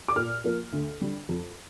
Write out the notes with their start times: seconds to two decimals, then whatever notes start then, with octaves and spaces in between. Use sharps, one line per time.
0.08 D6
0.16 A#2 F6
0.44 F3 A#3
0.73 D2
1.01 D3 G3
1.29 F2